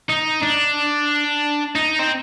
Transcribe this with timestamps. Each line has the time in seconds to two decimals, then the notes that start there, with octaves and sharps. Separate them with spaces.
0.10 D#4
0.43 D4
1.75 D#4
1.99 C4